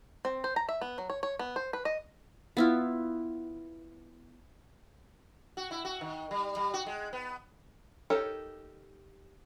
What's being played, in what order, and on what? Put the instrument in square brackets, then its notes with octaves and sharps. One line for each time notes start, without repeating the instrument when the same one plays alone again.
[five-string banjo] C4
C5
A#5
E5
B3
F#3
C#5
C#5
B3
C5
B4
D#5
[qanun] B3 E4 F4
[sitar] F#4
E4
F#4
D#3
G3
G3
F#4
G#3
B3
[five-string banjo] D#4 G4 A4 A#4 C#5